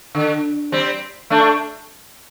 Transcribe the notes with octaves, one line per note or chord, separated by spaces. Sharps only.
D3
G3 C4
A3 D4